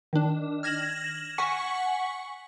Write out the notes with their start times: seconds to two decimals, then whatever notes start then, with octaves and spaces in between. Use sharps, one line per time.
0.13 D#3 D4
0.63 F6 G#6 A#6 E7 F#7
1.38 F#5 G#5 C#6 B6 C#7